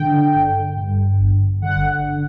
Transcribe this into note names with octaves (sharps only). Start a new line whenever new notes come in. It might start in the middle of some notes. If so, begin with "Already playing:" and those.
Already playing: D3 G5
G1
G2
G1
D3 F#5